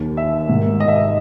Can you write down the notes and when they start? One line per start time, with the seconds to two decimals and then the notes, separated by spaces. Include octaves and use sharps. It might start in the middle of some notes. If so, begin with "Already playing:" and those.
Already playing: D#2 D#3
0.17 E5
0.49 G#2 D#3
0.80 D#5
0.88 E5
0.96 D#5